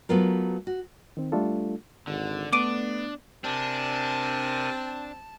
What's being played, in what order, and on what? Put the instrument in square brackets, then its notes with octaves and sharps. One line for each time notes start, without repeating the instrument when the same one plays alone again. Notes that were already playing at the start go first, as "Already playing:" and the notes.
[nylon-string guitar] F#3 A3 B3 F4 A#4
F#4
[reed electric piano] D#3 C4
G3 A3 D4 F4 A4
[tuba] G#1 [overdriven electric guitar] D3
[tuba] A3 [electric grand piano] B3 [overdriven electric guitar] D4 [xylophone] D6 D7 D#7
[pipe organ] C3 A#4 G#5 [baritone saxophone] C4 [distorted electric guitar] D4 [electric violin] A5